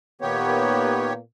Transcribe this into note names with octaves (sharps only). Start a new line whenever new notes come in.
A#2 D#3 A#3 B3 G4 C#5